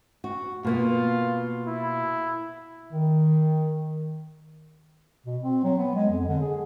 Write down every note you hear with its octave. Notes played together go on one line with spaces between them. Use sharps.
F#4
B2 A#3 B3 F4
E4
D#3
B2
C4
F#3
B3
G#3
F2
D3
G#4